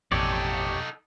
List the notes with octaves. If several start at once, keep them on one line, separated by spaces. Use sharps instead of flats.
A1 F2 B2 D#4 G4 A4 C#5 D5